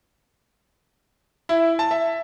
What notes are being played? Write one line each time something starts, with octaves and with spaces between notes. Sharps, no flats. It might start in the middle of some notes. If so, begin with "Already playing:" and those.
E4
A5
E5